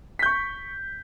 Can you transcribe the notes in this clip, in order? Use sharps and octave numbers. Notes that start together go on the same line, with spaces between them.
C#6 G6 B6